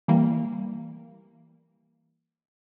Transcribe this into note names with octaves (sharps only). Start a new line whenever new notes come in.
E3 G3 A#3